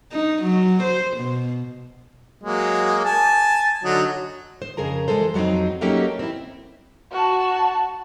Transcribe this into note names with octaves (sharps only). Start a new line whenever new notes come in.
D#4
F#3
C5
B2
F#3 G#3 A#3
G#5 A5
D3 F#3 D#4
C5
F2 C#3 G#4 A#4 A#5
E3 G#3 A4 C5
F2 F#3 G3 C4 D#4
F#3 A3 A#3 C#4 D#4 G4
C4 E4
F#4 A5